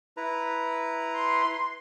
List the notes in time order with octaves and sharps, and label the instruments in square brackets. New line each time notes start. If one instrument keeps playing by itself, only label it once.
[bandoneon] E4 B4 A#5
[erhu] C6